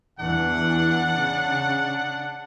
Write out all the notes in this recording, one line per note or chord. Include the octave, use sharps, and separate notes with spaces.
E2 E3 D4 F#5
C#3